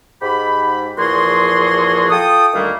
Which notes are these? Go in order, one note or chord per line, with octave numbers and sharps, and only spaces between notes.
G#2 G4 B5
E2 A#2 F3 F#4 G#4 C6
F4 A4 G5 D#6
D2 D#3 G3 A3 A#3 F5